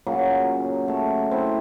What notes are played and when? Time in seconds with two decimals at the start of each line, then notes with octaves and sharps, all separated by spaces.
0.07 A#2 C#3 F#3
0.88 A3
1.31 C4 E4